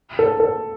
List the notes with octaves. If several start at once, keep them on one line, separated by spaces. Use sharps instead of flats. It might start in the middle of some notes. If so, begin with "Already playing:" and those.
A4
A4